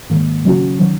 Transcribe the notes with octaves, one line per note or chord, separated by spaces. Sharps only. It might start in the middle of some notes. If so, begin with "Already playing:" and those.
G#2 D#3 A#3
C#3 F#3 C#4 F#4
D#3 F#3